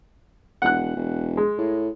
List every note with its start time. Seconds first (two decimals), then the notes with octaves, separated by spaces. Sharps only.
0.62 E1 F#5 F#6
0.96 E1
1.37 G#3
1.58 A2